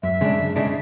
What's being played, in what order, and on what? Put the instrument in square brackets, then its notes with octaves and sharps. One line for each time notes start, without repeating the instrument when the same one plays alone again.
[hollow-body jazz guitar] F#2 [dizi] E5
[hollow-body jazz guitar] C#3 G#3 D4
F#2
C#3 G#3 D4